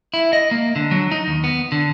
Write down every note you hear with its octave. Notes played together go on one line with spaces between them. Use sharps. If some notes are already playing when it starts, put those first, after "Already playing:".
E4
D#5
A#3
D3
F#3
D#4
D#2
B3
D3